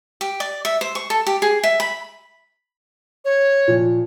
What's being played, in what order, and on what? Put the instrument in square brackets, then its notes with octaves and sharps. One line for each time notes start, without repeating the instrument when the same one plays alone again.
[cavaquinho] G4
D5
E5
C5
C#6
A4
G4
G#4
E5
B5
[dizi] C#5
[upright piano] A#2 F3